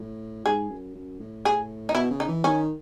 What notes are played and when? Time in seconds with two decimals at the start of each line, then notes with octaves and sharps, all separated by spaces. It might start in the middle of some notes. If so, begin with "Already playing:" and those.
Already playing: A2
0.45 G#2 G#4
0.70 F#2
0.94 F#2
1.20 A2
1.45 G#4
1.89 D#4
1.95 B2 E4
2.11 C#3
2.20 D#4
2.28 E3
2.44 D#3 C#4